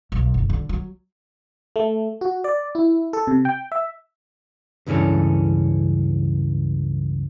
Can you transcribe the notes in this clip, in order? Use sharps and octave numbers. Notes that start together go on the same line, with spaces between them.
B1
F#1
D3
F#3
A3
F#4
D5
E4
A4
C3
G5
E5
C#2 G2 E3 C#4 A4